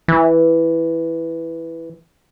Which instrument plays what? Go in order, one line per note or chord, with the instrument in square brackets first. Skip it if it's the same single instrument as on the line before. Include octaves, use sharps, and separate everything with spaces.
[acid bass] E3